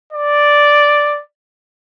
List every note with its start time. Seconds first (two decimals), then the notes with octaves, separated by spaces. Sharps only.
0.13 D5